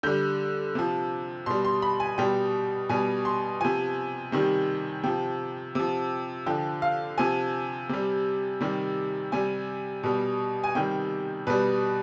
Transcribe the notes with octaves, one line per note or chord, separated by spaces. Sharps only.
D3 G3 G6
C3 F3
B2 G3 C6
C6
B5
G#5
B2 G3 G5
B2 G3 G#5
C6
C3 F3 G#5
C3 D#3 G3
C3 F3 G5
C3 F3
D3 F3 G5
F5
C3 F3 G#5
C3 G3
C3 D#3 G3
C3 G3 G#5
B2 G3
G#5
C3 D#3 G3 G5
B2 G3 B4